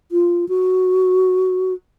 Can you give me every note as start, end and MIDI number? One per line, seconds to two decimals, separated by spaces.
0.12 0.45 65
0.49 1.74 66